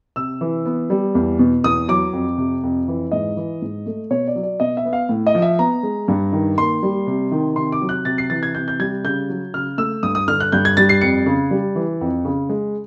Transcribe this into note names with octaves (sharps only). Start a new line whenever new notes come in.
C3 E6
E3
B3
G3
E2
B2
E2 D#6
F#3 D6
F2
C3
F2
E3
G#2 D#5
E3
G#2
A3
B2 C#5
D5
F#3
D5
B2 D#5
E5
B3
F5
A2
D#5
F3
E5
B3 A#5
G#3
G2
D#3
A#3 C6
G3
C3
D#3
C3 C6
D6
F#3
F#6
C3 A6
C7
E3 A6
G#6
C3 G6
G6
G3 G#6
C#3 G6
F#3
C#3 F6
A3 E6
G2 D#6
D#6
D3 F6
F#6
G2 G6
G#6
G3 A6
C7
F2 C#7
C#3
G3
E3
F2
C#3
G#3